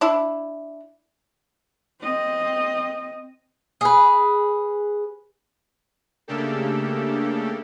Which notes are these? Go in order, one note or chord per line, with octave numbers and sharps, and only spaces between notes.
D4 E4
C4 D#5
G#4 B4
C#3 A3 A#3 D4 G4 A4